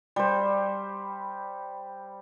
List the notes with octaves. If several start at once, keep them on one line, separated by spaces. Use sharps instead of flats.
G3 C5